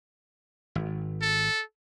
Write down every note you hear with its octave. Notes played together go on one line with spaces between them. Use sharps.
G#1
A4